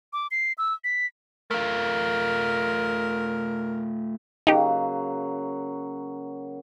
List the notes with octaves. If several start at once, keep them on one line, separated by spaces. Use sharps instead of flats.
D6
C7
E6
B6
A3 F4 A#4
C#3 F#3 A#3 D#4 G4